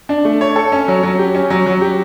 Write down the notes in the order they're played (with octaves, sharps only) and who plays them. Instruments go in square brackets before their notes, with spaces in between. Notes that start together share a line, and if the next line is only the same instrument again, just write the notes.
[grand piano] D4
A3
C#5
A4
C#4
F#3
F#3
G4
C#4
F#3
F#3
G4